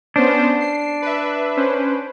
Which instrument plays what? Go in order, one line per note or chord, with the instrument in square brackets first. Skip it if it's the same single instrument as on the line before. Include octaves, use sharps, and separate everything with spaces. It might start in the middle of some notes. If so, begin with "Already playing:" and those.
[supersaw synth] B3 C#4 C5 [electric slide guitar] D4
[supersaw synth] C7
B4 E5
C#4 B4 C5